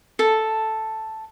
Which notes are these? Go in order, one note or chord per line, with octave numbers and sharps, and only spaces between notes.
A4